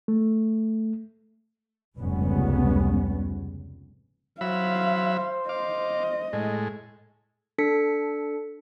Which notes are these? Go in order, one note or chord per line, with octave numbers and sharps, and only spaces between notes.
A3
F1 C#2 G#2 G3 B3 C#4
F#3 C5 E5 F5 B5
D#5 F5 D6
A2 G#3
D4 A4 B6 C#7